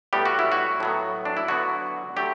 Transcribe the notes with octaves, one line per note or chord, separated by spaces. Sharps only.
A2 G3 B3 G4
F#4
E4
F#4
A2 F#3 B3
D4
E4
D3 F#3 B3 F#4
D3 F#3 A3 G4